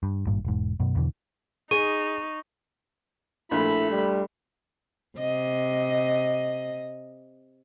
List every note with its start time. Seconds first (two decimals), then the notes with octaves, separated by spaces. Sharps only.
0.03 G2
0.27 G#1 G2 A#2
0.45 E1 G#2
0.80 F#2 B2
0.96 E2 B2 D3 E3
1.71 D#4 G#4 C#6 D#7
3.51 A#1 A3 E4 B5
3.91 G3
5.18 C3 D#5